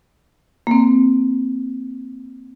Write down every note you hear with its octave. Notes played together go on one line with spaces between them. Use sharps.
A#3 C4